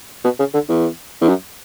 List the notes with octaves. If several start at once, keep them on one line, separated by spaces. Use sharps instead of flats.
B2
C#3
D3
E2
E2
F#2